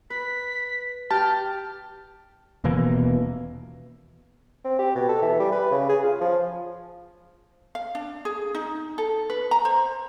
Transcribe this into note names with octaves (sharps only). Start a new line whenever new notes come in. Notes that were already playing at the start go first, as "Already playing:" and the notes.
B4 B6
G4 G5 A5 F6
D#1 B2 E3 A#3
C4
G4
B2
A4
E3
G3
B4
C#3
G#4
F4
F3
F5
D4
G#4
D#4
A4
B4
A#5
C5